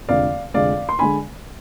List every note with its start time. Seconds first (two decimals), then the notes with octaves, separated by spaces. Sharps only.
0.09 F1 F2 D3 G#3 D5 F5
0.54 F1 F2 D3 G#3 D5 F5
0.89 C6
0.99 D3 G#3 G#5 B5